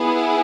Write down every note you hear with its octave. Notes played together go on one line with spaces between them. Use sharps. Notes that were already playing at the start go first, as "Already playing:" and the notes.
Already playing: B3 E4 G#4